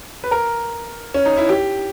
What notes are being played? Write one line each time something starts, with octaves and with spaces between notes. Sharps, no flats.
B4
A#4
C#4
D#4
E4
G4